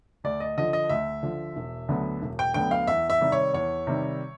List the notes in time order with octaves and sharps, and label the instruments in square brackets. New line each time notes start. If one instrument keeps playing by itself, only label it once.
[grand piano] D2 [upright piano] D5
[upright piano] D#5
[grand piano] D3 F3 [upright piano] D#5
[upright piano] D#5
[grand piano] D2 [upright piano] E5
[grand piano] D3 F3
E1
D2 D3 F#3 B3
E1
[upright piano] G5
[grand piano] D2 D3 F#3 B3 [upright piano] G5
[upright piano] F5
[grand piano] E2 [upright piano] E5
[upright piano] E5
[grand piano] C3 D#3 G3
[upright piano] C#5
[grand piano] E2 [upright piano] C#5
[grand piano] C3 D#3 G3